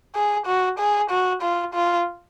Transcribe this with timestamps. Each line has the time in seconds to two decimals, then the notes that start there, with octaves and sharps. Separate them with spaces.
0.15 G#4
0.46 F#4
0.79 G#4
1.10 F#4
1.42 F4
1.74 F4